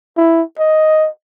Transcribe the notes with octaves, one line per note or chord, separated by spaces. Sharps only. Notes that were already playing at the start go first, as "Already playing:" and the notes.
E4
D#5